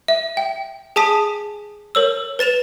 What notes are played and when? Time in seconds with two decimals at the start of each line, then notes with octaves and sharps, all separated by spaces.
0.08 E5
0.37 G5
0.96 G#4 G#5 A5 D#6 B6
1.95 A#4 C#5 E6
2.39 B4 A6 E7 F7